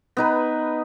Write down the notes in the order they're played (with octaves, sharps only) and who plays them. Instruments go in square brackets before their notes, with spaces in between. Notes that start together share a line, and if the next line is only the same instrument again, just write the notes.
[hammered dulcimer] B3 D#4 B4